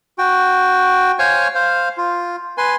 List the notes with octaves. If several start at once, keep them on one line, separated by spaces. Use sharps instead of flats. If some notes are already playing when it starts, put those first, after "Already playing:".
F#4 G5
C5 C#5 F5 G#5 C#6
C5 F5
F4
B4 G#5 C6